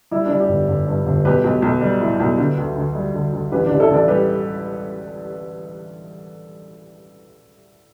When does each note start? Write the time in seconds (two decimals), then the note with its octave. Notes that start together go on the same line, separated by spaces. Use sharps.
0.11 G3 E4
0.26 D4 G4
0.31 G3
0.39 D4 G4
0.49 G1
0.68 G1
0.87 G2
1.05 G1
1.25 B1 G4 B4
1.44 B1
1.62 B1
1.81 G3
2.01 A2
2.20 B1
2.38 D3
2.57 D2
2.76 D2
2.95 G3
3.14 D2
3.33 D2
3.52 A1 G4 B4
3.66 A1 D4 G4
3.79 E4 A4
3.90 A1 A4 D5
4.08 G3 G4 B4